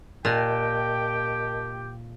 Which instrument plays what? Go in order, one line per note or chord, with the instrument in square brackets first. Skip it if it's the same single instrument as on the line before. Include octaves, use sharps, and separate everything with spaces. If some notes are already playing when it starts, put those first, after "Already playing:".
[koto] A#2 [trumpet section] G4 G5 [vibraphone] A#4 D#5 A5